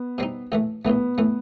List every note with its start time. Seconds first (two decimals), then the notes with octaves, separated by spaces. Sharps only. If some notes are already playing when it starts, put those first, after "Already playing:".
Already playing: B3
0.18 B2 G3 C4 D#4
0.52 A#1 A2 E3 A3
0.85 A#1 A2 E3 A3 B3
1.18 A2 E3 A3